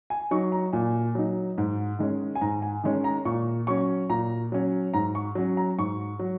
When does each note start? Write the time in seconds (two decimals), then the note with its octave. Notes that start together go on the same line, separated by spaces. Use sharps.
0.10 G#5
0.31 F#3 D#4 C#6
0.52 A#5
0.73 A#2 G#5
1.15 F#3 D#4
1.58 G#2
1.99 D#3 G#3 C#4
2.35 G#5
2.41 G#2 A#5
2.62 G#5
2.84 D#3 G#3 C#4
3.04 A#5
3.25 A#2 C#6
3.67 F#3 C#4 C#6
4.10 A#2 A#5
4.52 F#3 C#4
4.94 G#2 A#5
5.15 C#6
5.35 F#3 C#4
5.57 A#5
5.78 G#2 C#6
6.19 F#3